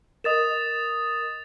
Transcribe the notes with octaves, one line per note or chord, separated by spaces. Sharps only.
A#4 D#5 D#6 A6 E7